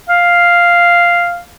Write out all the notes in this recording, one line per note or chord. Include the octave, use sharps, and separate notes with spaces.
F5